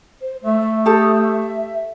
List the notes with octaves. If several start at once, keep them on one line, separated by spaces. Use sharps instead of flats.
C5
A3 E5
G4 A4 D#6
E5